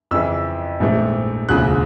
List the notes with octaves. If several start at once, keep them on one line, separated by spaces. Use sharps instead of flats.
F2 C#3 E3 E6
A#1 G#2 E3 A3 C4
E1 D2 C#3 F3 F#6